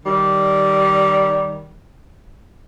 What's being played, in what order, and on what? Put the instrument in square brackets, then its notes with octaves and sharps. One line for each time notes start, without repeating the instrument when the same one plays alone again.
[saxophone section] D#3 G3